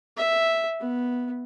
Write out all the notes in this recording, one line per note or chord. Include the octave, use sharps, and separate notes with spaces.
E5
B3